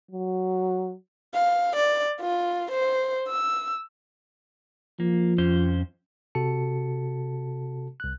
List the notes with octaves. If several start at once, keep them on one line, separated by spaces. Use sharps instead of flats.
F#3
F5
D5
F4
C5
E6
F3 A#3
F2 C#4 C5
C3 F#4 A4 A5 C#7
C2 F#6